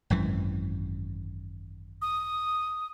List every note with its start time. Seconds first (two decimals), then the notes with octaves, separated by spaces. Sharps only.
0.10 G#1 F#2 E3
2.02 D#6